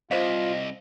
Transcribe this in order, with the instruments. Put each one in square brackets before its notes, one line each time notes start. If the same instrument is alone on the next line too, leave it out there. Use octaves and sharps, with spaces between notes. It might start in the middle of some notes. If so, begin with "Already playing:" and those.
[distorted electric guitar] C2 [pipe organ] F4 [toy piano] C5 F5 [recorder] D#5